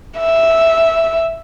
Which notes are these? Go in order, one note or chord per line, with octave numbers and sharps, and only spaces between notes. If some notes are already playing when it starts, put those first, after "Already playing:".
E5